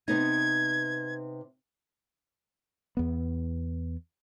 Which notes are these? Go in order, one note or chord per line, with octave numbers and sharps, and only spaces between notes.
C3 B3 D#4 G#6
E2 B3